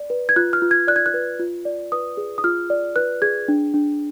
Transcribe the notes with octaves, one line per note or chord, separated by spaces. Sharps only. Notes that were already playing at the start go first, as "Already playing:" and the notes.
Already playing: D5
B4
G#6
F4 F#6
F6
F4
G#6
D5 F#6
G#6
F#6
B4
F4
D5
B4 D#6
G#4
D#6
F4 F6
D5
B4 F#6
G#4 G#6
D4
D4